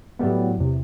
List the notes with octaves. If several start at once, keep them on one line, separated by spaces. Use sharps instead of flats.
A2 F#3 G3 B3
E2 C3